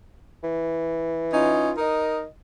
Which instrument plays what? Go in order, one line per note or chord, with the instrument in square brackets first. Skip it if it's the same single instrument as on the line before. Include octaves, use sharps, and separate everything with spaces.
[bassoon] E3
[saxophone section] C#4 D#4 F4
D#4 A#4 D#5